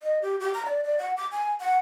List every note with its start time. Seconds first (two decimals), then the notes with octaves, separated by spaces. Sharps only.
0.02 D#5
0.22 G4
0.40 G4
0.54 A#5
0.65 D5
0.84 D5
0.99 F#5
1.17 D6
1.31 G#5
1.60 F#5